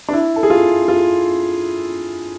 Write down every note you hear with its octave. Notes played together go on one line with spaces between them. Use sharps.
D4
E4
A4
G#4
F4
F4